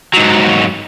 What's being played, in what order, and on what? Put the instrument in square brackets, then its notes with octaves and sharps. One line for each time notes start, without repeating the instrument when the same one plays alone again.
[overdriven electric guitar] G#2 F#3